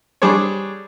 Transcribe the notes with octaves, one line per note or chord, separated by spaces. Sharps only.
G3 D4 G#4 C5 C#5